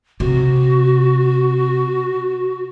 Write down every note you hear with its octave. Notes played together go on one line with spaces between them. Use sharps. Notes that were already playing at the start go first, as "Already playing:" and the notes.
C3 F#4